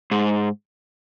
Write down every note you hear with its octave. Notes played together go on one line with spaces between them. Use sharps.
G#2